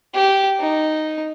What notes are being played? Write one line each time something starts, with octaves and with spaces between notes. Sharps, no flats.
G4
D#4